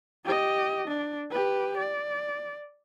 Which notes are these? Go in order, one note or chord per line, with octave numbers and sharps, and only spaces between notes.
G4 D#5
D4
G4 B4
D5